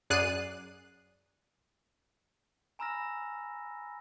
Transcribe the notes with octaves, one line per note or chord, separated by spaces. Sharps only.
F#2 G#4 D5 F#6 C7 D#7
G#5 A#5 B5 E6 F6 A#6